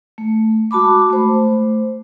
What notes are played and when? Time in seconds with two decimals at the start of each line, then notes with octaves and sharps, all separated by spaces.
0.18 A3
0.71 G#3 F#4 A5 B5 D6
1.10 A3 C5